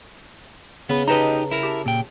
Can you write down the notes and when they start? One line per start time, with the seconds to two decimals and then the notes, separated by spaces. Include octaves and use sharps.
0.89 C#3 B3 B4
1.08 D#4 G4 B4 D#5 A5 A#5
1.51 E4 A#4
1.63 G4 A5
1.86 A#2 G5